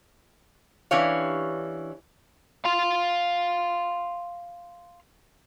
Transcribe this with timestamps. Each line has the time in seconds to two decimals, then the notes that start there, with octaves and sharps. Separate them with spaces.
0.91 E3 C#4 D4 G4 C#5 F5
2.65 F5 C6